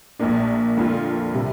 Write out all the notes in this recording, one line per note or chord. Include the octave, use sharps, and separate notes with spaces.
A#1 A#2 A#3 D4
F2 D3 A#3 F4
C3 G3